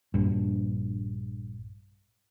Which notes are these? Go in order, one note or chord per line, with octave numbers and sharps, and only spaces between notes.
A#1 G2